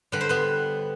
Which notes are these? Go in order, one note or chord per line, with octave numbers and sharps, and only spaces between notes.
D3 G3 B4
C5
B3 B4